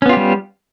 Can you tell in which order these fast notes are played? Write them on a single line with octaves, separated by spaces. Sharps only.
C#4 B3 F4 G4 G3